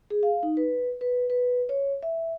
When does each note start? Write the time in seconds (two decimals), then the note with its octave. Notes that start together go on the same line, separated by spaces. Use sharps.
0.10 G#4
0.23 F5
0.43 D#4
0.57 B4
1.01 B4
1.30 B4
1.69 C#5
2.03 E5